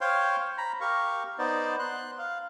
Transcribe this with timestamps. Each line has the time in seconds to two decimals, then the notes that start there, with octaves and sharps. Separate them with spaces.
0.01 C5 C#5 F5 G5 C6
0.58 A#5 B5
0.81 G4 A#4 F5 C#6
1.38 B3 D#4 C5 D5
1.79 C6 F#6
2.19 F5